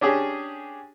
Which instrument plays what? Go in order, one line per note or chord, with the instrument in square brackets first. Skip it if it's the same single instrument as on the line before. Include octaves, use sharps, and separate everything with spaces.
[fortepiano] C#4 D4 G4 G#4